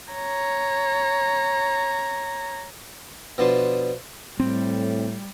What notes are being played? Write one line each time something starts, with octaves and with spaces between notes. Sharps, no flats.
C#5 A#5
B2 F3 B3 D4 A5 C6
A2 G3 C4